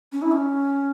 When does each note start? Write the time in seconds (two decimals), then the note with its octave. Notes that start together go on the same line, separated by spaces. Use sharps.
0.12 C#4
0.22 E4
0.32 C#4